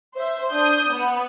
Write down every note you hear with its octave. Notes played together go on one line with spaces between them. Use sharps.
C5 E5
D4 D#6 G6
B3